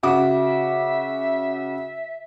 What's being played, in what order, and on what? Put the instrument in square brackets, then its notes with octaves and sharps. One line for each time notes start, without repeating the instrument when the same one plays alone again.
[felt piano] C#3 F#4 D6 [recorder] E5